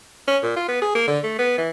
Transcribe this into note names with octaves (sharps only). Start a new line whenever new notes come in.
C#4
A#2
F4
B3
G#4
A#3
D3
A3
B3
E3